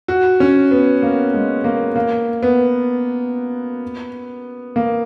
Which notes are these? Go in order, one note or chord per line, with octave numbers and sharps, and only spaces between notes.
F#4
C#4
B3
A#3
G#3
A#3
A#3
B3
A#3